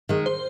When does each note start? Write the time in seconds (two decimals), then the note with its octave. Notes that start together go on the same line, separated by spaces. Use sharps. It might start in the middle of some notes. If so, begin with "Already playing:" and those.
0.09 D#3 G#3
0.26 C5